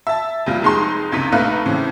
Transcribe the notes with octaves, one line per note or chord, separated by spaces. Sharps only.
E5 A5
F1 F2 G3 F4
F1 F2 G#3 D#4 C6
F#1 C#2 C3 D#4 B6 D#7
A#1 A3 D#4 B4 F5 F#6
A2 C#3 E3 C4